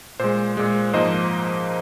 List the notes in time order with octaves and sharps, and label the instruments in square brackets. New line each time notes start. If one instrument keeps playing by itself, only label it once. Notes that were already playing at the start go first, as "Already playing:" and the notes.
[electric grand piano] A#2 G#3 C5
A#2 G#3
G#2 F3 A#3 C5 D#5